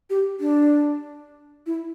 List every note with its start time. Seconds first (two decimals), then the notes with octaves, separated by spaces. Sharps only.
0.10 G4
0.40 D4
1.66 E4